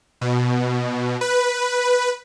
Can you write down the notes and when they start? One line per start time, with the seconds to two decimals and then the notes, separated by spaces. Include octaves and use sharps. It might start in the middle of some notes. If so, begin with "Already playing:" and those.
0.21 B2
1.21 B4